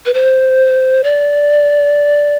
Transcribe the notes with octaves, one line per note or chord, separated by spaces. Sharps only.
B4
C5
D5